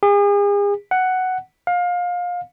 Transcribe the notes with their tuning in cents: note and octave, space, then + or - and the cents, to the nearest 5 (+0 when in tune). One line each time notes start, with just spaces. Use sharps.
G#4 -40
F#5 +5
F5 +25